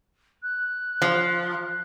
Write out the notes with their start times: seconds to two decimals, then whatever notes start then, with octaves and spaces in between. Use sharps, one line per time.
0.43 F#6
1.02 F3